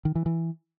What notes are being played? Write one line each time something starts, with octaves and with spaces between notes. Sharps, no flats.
D#3
E3
E3